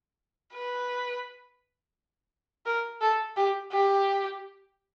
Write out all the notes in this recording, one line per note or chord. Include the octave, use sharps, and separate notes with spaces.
B4
A#4
A4
G4
G4